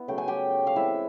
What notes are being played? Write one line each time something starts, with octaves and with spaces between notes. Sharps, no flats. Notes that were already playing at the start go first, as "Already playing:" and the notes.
Already playing: B3 E4
C#3 F#3 A3 G5
G#5
G4 G5
F5
E3 G#3 C4 E4 E5